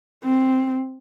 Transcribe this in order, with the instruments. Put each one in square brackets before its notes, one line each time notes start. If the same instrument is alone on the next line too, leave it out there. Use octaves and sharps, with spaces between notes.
[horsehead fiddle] C4